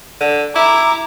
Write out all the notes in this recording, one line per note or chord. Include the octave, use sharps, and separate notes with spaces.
D3
E4 A#5 D6